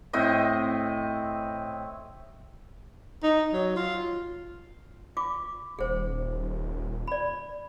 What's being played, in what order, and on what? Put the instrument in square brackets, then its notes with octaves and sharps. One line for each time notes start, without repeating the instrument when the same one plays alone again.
[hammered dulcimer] A2 C4 D#5
[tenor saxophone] D#4
F#3
F4
[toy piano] F4 D6
[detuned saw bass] D#1 [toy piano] G#4 C5
[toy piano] D5 B5